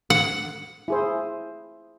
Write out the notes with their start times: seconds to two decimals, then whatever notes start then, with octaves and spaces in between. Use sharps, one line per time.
0.10 F#5
0.88 E4 G#4 C5